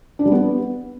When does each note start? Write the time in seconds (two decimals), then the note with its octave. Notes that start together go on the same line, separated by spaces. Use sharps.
0.19 D4
0.25 G3
0.32 B3